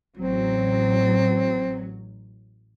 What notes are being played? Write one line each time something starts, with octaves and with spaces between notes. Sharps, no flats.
A1 F#3 C4